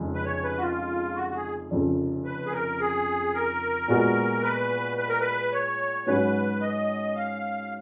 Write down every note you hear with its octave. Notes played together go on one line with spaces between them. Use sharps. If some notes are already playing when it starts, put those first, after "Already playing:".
Already playing: F1 F2 C#3 G#3
B4
C#5
B4
F#4
F4
F#4
F#4
G#4
F1 F2 C#3
B4
G#4
A#4
G#4
A#4
A#2 G#3 B3 F#4
B4
B4
A#4
B4
C#5
G#2 F#3 C#4 F#4 B4
D#5
F5